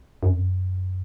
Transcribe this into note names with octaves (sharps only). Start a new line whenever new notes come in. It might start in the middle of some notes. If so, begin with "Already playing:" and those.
F#2
F2
F#2